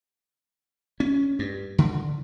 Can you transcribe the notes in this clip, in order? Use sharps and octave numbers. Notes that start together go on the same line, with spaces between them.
C#4
G2
D3